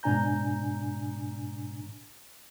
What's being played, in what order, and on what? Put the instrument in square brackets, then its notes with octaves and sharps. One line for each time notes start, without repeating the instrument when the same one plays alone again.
[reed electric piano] G#2 B2 D4 G#5 A#5 G6